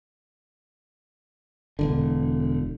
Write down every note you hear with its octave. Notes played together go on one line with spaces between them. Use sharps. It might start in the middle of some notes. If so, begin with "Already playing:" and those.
E1 B1 D3